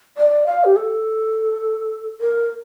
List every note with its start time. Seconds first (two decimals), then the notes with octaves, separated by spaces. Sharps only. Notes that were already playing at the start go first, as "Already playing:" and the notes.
0.18 D5
0.47 F5
0.64 G4
0.76 A4
2.21 A#4